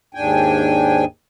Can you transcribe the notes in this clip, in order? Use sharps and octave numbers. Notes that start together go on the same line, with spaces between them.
D#2 G#2 D4 G5 G#5